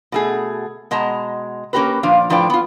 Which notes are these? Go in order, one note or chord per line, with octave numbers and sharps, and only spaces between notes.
B2 A3 G#4
B2 G#3 D#5 A5 A#5
A#3 C#4 F#4 G4 A#4 B4
A#2 F3 D4 F5
A2 F3 D4 B4 D5 G5
B3 F4